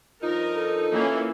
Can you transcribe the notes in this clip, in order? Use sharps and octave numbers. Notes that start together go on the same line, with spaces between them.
G2 F3 D#4 F4 A#4
A4
E3 A#3 C#4